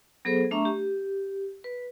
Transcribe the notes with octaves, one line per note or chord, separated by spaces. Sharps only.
F#3 B3 G#4 A4 C5
A3 D4 E5 A#5 C#6
G4
B4